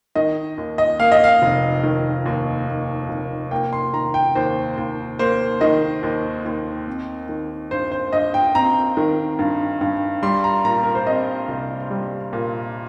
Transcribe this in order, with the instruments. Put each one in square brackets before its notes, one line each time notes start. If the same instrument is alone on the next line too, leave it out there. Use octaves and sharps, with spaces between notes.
[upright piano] D#3 D#5
D#2
D#5
A#3 F5
D#5
F5
F1
D#3
D#2
A#3
F1
A#3 G5
C6
D#3 A#5
G5
D#2 C5
D#2
A#3 C5
D#3 D#5
D#2
D#2
C4
D#3
G2 C5
C5
G2 D#5
G5
C4 A#5
D#3
G2
G2
G3 C6
A#5
A#2 A#5
A#4
C5
C4 D#5
C2
G3
A#2